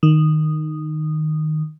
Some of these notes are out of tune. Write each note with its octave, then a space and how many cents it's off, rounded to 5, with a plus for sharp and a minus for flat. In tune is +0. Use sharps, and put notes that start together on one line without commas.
D#3 -10